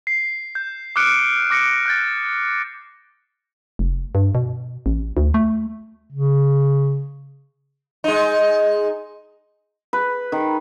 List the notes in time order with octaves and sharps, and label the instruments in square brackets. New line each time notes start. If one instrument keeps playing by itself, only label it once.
[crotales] C7
G6
D6 D#6 F6 F#6 C#7 D7
D6 A#6 C#7 D7
F#6 G6 A6
[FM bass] F1
G2
B2
A1
D2
A3
[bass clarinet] C#3
[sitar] G#3 D#4
[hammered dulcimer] B4
D#3